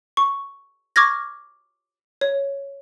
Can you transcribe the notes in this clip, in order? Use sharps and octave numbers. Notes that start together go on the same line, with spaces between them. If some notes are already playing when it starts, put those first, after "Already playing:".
C#6
C#6 D6 F6 G#6 A#6
C#5